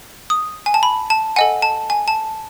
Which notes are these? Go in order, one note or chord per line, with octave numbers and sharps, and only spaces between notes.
D#6
G#5
A5
B5
A5
A4 D#5 F#5 G#5
A5
G#5
A5